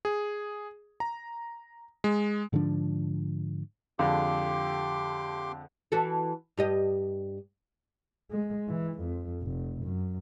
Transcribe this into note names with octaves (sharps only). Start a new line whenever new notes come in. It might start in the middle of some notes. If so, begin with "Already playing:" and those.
G#4
A#5
G#3
G#2 D3 F3 D4
F2 D3 G#3 G4 F5 C6 D6
E3 F#4 A4
G2 G4 D#5
G#3
E3
F2
F1
F#2